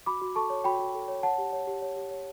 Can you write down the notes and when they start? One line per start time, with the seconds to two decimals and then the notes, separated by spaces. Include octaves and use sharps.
0.06 F#4 B5 D6
0.22 F#4
0.36 A4 A5 C#6
0.50 C#5
0.64 F#4 G5 B5
0.79 F#4
0.94 A4
1.08 C#5
1.23 C#5 F#5 A5
1.38 G4
1.53 C#5
1.67 G4
1.82 C#5
1.96 G4
2.11 C#5